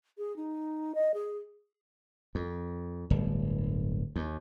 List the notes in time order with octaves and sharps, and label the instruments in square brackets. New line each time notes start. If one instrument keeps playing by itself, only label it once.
[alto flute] G#4
D#4
D#5
G#4
[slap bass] F2
D1 G1
D#2